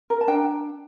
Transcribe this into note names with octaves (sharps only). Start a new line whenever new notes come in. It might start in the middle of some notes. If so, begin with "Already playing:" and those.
A#4
A5
D4 G5